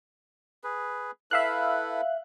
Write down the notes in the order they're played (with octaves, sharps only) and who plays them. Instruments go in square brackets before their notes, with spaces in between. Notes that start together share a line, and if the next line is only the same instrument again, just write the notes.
[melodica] G#4 B4
[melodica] E4 A4 B4 [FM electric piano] E5 F5 F#6